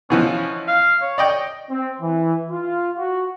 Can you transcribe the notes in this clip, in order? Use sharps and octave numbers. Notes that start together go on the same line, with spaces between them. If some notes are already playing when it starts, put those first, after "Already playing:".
B2 E3 F3 C#4
F5
C#5
D5 D#5 G5
C4
E3
F4
F#4